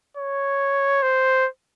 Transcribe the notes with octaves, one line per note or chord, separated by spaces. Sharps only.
C#5
C5